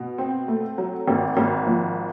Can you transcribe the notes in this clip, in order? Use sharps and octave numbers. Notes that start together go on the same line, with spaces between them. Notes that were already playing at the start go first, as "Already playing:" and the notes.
Already playing: B2
C4
A3
F#3
G#1
G#1
F3